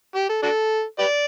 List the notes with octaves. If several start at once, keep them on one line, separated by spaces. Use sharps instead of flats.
G4
A4
D4 F#4 A4
G4 B4 D5